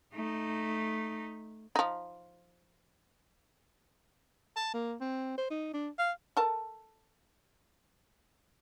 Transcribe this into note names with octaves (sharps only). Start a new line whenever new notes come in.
A3 D#4
F3 D#4
A5
A#3
C4
C5
D#4
D4
F5
A4 A#4 A5